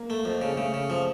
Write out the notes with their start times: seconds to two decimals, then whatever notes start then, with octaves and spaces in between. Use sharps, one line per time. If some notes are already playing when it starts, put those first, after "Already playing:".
Already playing: A#3
0.10 A3
0.25 F2
0.41 C#3
0.57 C#3 A3
0.74 C#3
0.90 F3